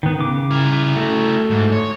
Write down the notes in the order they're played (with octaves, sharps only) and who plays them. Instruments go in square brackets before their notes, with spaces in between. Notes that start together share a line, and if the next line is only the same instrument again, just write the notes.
[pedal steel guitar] D#3 B3
C#3 D6
[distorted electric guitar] E4 A#4
[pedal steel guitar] A3 F#4
[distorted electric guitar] G#2
C#5